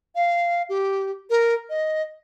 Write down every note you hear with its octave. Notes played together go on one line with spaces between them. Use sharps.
F5
G4
A#4
D#5